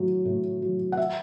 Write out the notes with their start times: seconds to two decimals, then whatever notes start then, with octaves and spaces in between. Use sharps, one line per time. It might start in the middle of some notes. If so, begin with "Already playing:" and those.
Already playing: A2 F#3
0.25 A2
0.62 F#3
0.92 F#5
0.97 E5